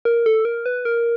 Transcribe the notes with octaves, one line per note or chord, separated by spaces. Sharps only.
A#4
A4
A#4
B4
A#4